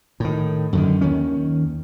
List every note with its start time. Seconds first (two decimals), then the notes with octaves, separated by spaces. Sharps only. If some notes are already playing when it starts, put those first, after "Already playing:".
0.20 A2 D#3
0.73 F#2 D3 D#3
1.01 D#2 D#3 C#4